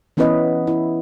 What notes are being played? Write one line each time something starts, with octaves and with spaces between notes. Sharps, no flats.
E3 B3 C#4 E4 B4 D#5
E4